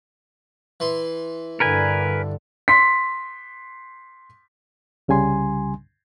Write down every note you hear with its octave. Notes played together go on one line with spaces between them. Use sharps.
E3 C6
G2 D3 A#4 B4 G#5
C6 B6
C2 C#3 G3 G#5 C6